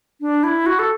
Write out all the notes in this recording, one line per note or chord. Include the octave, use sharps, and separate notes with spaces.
D4
E4
F#4
A4